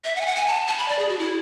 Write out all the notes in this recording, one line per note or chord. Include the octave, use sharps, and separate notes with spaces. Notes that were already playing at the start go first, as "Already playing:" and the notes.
E5
F#5
G#5
F#5
G#5
A5
A5
B5
D5
G#4
F#4
E4